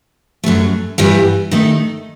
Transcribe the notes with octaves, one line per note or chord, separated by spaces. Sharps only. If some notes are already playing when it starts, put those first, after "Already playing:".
F#2 F#3 A3
G2 E3 G3 B3
D#3 A3 D#4